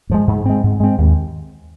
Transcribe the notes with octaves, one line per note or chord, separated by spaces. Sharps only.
G#2 F3 G#3
G#2
G#3 C4
G#2
G#3 C4
D#2